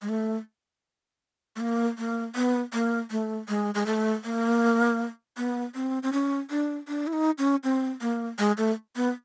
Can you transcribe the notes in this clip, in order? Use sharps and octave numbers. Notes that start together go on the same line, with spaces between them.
G#3
A3
A3
A#3
A#3
B3
A#3
A3
G#3
G#3
A3
A#3
B3
C4
C4
C#4
D4
D4
E4
D#4
C#4
C4
A#3
G#3
A3
B3